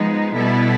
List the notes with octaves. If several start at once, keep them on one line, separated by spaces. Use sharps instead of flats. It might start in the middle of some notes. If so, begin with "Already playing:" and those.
Already playing: F3 G#3 B3 D#4
B2 G3 B3 E4 A4